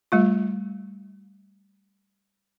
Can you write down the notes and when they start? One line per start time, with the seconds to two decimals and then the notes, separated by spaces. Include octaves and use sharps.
0.12 G3 A3 F4